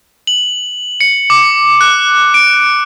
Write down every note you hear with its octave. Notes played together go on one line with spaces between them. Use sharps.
F#7
C#7
D6
F#6
D7